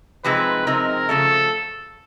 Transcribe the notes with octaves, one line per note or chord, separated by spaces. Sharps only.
C3 F3 G#3 C4 D#4 B4
C3 F3 G#3 C4 D#4 A#4
C#3 F3 A3 A4